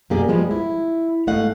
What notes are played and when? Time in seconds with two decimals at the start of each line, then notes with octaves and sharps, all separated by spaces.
0.10 F#2 B2 A#3 G4 G#4 D5
0.28 F3 G3 G#3 B3
0.51 E4
1.27 G#2 A3 D#4 F5 F#5